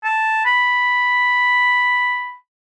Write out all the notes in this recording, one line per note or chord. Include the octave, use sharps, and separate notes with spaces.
A5
B5